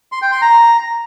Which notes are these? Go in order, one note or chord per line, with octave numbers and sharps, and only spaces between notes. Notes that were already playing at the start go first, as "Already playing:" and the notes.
C6
G5
C6
A#5